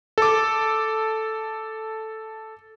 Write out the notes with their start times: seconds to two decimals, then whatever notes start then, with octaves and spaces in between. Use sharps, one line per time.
0.18 A4 D6